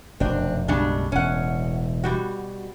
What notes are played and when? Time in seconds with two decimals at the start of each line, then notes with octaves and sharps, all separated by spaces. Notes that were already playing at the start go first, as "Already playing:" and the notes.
0.20 F1 F#2 B2 C4 D4
0.68 B1 F#2 C#3 G3 G#3 D4
1.12 E1 A2 C#4 F#5
2.04 B2 G3 F#4